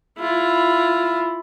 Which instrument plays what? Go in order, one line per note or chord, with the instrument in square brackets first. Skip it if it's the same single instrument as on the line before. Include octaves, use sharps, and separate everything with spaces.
[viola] E4 F4